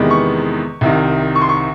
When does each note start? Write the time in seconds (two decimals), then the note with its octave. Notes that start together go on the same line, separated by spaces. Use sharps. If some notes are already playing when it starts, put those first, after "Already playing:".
Already playing: E2 C3 D#3 G#3 B3
0.10 C#6
0.81 C2 C3 D#3
1.35 C#6
1.41 C6
1.49 C#6